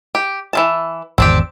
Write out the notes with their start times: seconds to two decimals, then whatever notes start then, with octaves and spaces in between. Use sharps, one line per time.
0.15 G4
0.53 E3 F3 A5
1.18 G#1 E2 D3 C4 D4 G4